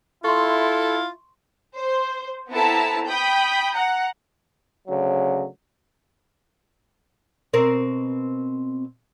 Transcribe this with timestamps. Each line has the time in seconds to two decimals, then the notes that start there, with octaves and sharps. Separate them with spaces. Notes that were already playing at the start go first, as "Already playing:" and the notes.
0.24 E4 F4 A4 C6 C#6
1.76 C5
2.49 B3 C4 E4 A4 A5 A#5
3.06 G5 B5 D#6 G6
3.72 F#5 A#5
4.87 D2 C#3 F#3
7.53 B2 C4 A#4